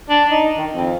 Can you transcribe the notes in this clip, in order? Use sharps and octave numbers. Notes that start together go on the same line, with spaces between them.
D4
D#4
D#3
F2